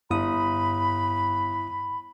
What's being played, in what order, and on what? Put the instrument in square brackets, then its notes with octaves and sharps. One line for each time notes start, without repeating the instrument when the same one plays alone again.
[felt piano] G1 [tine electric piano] G2 E4 D#6 [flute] B5